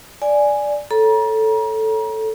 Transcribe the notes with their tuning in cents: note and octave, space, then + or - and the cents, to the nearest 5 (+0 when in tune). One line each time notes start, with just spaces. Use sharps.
D5 +0 F5 -40 G#5 +0
A4 +0 C#5 +0 A#5 +35